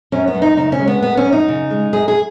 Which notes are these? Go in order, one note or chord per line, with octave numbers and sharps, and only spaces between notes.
F#2 C#4
B3
F#2
D#4
C#3 D#4
C#4
G#3
B3
F#2 B3
C#4
F#2
D#4
C#3
G#3
F#2 G#4
G#4